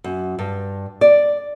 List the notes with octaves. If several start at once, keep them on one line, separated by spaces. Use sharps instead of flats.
F#2
G2
D5